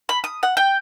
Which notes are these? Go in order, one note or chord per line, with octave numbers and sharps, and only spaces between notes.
B5
D#6
F#5
G5